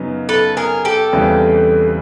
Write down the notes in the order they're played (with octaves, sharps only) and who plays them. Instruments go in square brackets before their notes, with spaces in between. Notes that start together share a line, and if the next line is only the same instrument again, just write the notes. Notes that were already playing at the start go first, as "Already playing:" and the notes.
Already playing: [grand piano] F#2 C#3 F#3 B3 D#4
[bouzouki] A4 B4
G#4 A#4
G4 A4
[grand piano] E2 C#3 E3 G3 C4